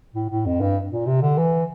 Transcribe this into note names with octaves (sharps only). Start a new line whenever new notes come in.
A2
A2
F2
G2
A#2
C3
D3
E3